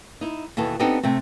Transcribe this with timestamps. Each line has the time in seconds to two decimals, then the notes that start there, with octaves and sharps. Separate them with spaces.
0.21 D#4 E4
0.57 D#2 B2 E3 A4
0.79 B3 C4 D4 D#4 G4 A4
1.03 C3 A3 C4